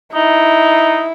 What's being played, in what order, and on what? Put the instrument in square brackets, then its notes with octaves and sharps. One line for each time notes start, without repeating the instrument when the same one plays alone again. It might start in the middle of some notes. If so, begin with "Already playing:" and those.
[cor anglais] D#4 [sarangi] E4